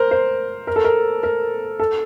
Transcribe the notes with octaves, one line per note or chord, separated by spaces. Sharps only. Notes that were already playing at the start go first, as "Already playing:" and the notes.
Already playing: A#4 C5
C5
A#4
A4
A#4
A#4
A4